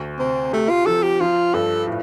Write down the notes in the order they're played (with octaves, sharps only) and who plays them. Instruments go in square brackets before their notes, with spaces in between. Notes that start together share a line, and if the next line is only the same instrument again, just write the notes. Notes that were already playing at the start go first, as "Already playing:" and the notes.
Already playing: [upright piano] D2
[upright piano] C3 [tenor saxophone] C4
[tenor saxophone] A3 [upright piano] G4
[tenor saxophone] F4
[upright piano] F3 [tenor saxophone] A4
[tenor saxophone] G4
[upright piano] F3 [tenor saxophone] F4
[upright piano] G2 [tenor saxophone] A4
[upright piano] A2